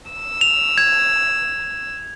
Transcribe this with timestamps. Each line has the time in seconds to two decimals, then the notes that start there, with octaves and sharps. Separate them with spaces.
0.11 E6
0.41 F7
0.78 G#6